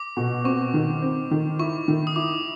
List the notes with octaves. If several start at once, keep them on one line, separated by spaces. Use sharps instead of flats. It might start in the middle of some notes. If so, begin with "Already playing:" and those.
Already playing: D6
B2
C4 C#6
D#3
C4
D#3
E4 C#6
D#3
D#6
E4 D6